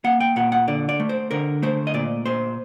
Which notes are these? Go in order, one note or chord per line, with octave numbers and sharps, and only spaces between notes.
A#3 F#5
G5
A#2 F#5
F#5
D3 D5
D5
A3
C5
D3 A#4
A3 C5
D#5
A#2 D5
A#2 C5